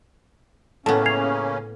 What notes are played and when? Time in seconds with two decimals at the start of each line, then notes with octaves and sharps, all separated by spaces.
0.86 A2 C#3 A#3 B3 C#4 A5
1.06 G#6 C7 F7